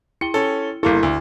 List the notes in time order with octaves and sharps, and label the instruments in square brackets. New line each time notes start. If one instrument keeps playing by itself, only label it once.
[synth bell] E4 G5 G7 [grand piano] C#7
[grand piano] C#4 A4
[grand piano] G1 A#3 A4 [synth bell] E4
[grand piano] D2